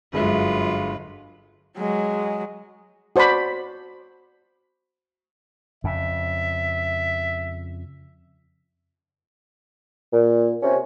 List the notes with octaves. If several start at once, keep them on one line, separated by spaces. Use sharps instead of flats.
G1 F#2 G#3 F4 B4 E5
F#3 G#3
F#4 C5 D5 A5 B5
F2 C#3 E5
A#2
C3 C#4